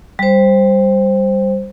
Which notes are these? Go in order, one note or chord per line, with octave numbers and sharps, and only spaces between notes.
G3 C5